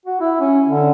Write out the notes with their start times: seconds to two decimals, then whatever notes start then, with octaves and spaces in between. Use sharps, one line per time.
0.05 F#4
0.21 E4
0.40 C#4
0.67 D3